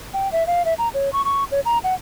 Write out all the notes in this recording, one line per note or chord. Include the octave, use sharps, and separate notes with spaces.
G5
E5
F5
E5
A#5
C#5
C#6
C#6
C#5
A#5
F#5